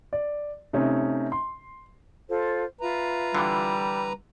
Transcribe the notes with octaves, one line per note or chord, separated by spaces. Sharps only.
D5
C3 A3 C#4 D#4
C6
F4 A4 C5
F4 B4 E5 A#5
D3 E3 G3